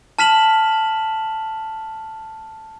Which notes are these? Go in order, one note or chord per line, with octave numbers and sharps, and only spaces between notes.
A5 F6 B6 E7 F#7